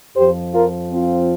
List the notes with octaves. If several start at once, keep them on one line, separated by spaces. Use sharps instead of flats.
F2 F3 G4 C5
F4 A#4
C4 F4